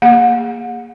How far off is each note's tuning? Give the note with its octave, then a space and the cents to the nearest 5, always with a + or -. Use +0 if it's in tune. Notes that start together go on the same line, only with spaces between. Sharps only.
A#3 +0 G#4 -20 F#5 -40